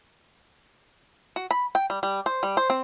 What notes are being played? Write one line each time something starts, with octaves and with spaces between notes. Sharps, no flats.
F#4
B5
G5
G3
G3
C5
G3
C5
C4